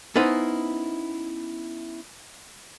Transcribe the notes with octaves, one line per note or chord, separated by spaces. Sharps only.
B3 C#4 D#4 E4 B4 C5